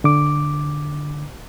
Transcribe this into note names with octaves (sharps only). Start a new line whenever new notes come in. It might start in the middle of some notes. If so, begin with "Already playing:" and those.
D3 D6